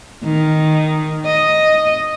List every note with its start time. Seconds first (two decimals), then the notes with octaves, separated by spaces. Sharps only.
0.24 D#3
1.26 D#5